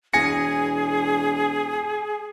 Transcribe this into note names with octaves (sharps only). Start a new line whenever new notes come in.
E1 G#4 G#5 A#6 C#7